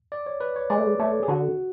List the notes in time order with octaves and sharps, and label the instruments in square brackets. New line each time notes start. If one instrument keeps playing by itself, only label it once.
[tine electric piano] D5
C#5
B4
C#5
[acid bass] G#3 [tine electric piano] D5
[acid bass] A3
G#3
[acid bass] A3 [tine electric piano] C#5
[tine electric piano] G#4
[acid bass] D3 [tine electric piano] F#4